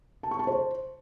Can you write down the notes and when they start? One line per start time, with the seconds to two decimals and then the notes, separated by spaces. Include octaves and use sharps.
0.23 A5
0.31 C#6
0.39 A5
0.47 C5